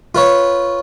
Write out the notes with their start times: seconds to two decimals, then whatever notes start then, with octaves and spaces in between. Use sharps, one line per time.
0.15 F4 B4 C#5